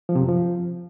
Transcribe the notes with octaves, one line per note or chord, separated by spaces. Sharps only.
F3
C3
F#2
F3